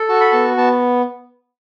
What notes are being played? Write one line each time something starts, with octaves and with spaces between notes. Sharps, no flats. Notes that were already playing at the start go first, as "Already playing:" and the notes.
Already playing: A4
F#4 A5
B5
B3 A5
B3 A5